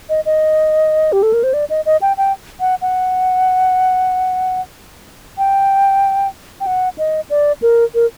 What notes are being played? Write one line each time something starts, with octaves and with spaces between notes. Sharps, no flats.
D#5
D#5
G4
A4
A#4
C5
D5
D#5
D#5
G5
G5
F#5
F#5
G5
G5
F#5
D#5
D5
A#4
A#4